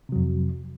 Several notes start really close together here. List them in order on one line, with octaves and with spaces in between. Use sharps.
C3 F#3 F2